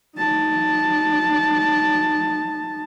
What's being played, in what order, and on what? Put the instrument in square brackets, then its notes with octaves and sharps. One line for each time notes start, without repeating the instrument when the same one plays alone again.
[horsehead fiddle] D#4 A5